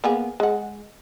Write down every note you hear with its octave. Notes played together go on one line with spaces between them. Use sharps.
A#3 B3 G#4
G#3 F#5